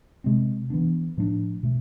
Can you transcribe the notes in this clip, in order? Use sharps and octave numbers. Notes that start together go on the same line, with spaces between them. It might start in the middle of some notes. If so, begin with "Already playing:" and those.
C3 G#3 C4
E3 B3 D4
A2 F3 A3 D4
B2 A3